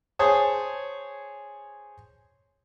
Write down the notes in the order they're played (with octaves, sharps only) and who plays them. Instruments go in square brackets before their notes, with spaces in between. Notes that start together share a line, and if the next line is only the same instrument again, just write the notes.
[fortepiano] G#4 C5 C#5 A5 D#6